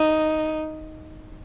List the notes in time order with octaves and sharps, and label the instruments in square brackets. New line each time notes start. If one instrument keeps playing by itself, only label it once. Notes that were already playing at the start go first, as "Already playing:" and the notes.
Already playing: [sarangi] D#4